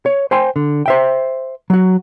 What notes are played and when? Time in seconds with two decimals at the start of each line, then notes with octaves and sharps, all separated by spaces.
0.06 C#5
0.31 C5 G5 G#5 C6
0.56 D3
0.86 C5 E5 G5
1.70 F#3 F#4